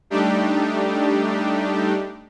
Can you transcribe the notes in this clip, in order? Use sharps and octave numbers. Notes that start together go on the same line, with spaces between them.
G3 A3 D4 D#4 G4